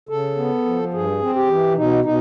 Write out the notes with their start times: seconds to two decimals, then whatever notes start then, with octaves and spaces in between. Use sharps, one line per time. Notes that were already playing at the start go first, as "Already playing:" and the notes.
0.09 C#3 A4
0.37 B3
0.65 F3
0.94 G2 G#4
1.22 C4
1.35 G4
1.49 E3
1.76 B2 D#4
2.04 B2 D#4